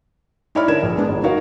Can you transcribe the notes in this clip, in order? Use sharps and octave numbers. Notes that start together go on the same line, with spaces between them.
D#4 E4 C#5 D5 B5 F6
D3 D4 A#4 G#6 E7
A#1
G#3 B3 D4 G#4
G1
D#4 F#4 A#4 C#5 F5